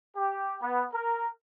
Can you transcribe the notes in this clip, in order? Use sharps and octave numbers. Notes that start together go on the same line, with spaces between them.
G4
B3
A#4